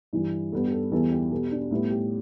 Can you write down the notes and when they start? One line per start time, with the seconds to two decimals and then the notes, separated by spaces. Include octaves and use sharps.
0.13 G2 E3 G3 E4
0.52 G2 G3 B3 A4
0.65 G4
0.72 A4
0.92 E2 E3 G3 B3 A4
1.12 G4
1.31 B2 G3 B3 A4
1.51 D4
1.71 A2 G3 B3 E4
1.91 G4